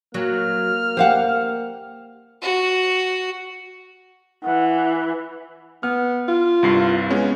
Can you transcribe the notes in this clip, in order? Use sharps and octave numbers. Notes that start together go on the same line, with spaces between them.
F#3 A#3 F6
G4 C5 F5 F#5
F#4
E3 F#5
B3 F6
F4
C2 G2 C7
G#3 B3 C#4